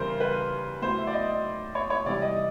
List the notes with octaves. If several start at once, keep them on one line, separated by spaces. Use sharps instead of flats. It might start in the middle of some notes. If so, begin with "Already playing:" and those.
Already playing: C#3 E3 G3 A#4 C5
B4
A2 F#3 C5
E5
D5
D#5
C#5
C#5
C3 E3 G3 D5
D#5